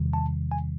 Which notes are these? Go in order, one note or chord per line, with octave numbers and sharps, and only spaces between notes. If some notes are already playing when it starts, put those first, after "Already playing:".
Already playing: E2 C3 D#3 G3
A5
G#5